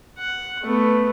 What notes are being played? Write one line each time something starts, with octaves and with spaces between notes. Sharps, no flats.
F#5
A3 B3